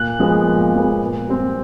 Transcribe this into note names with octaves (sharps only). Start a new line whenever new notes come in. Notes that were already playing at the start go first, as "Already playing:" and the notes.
Already playing: A#2 F#6
F3 G#3 B3
A#2
F3 G#3 B3
A#2
G3 C4